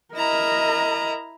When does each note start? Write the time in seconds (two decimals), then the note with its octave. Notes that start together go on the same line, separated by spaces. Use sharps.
0.15 E4 A#4 D#5 A#5